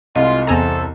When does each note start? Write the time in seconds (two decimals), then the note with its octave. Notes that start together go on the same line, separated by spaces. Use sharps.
0.16 C2 G#3 F4 D#5
0.47 E2 C4 A4 G#5 A#5